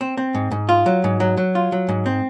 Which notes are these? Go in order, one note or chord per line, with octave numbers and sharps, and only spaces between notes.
C4
C4
G#2
G#2
F4
F#3
G#2
F#3
F#3
F4
F#3
G#2
C4